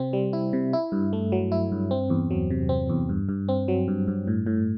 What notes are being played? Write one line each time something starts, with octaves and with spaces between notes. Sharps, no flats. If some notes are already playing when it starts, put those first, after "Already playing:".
Already playing: C3 C4
G3
E4
C3
E4
G2
A3
F#3
E4
G2
C4
E2
F#3
C3
C4
E2
G2
G2
C4
F#3
G2
G2
A2
A2